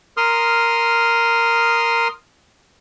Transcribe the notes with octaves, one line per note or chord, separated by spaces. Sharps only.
A#4 C6 D#6 F6